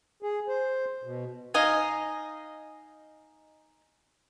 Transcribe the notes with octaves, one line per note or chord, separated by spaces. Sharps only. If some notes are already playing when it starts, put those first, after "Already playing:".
G#4
C5
B2
D#4 D#5 F5 G#5